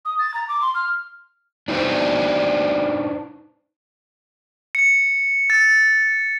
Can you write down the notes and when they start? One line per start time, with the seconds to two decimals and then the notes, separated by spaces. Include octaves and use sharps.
0.05 D#6
0.19 A6
0.34 A#5
0.49 D6
0.62 C6
0.75 F6
1.68 D4 D#4 B4 C5 D5
4.75 C#7
5.50 A6